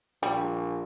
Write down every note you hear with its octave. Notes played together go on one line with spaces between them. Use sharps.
A#1 G3